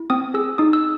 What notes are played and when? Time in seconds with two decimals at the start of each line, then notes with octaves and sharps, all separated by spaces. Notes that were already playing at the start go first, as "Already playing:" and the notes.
Already playing: E4
0.10 C4 D#6
0.34 G#4 E6
0.58 D#4 D#6
0.73 E6